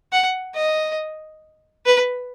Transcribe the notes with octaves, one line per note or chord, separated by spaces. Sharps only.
F#5
D#5
B4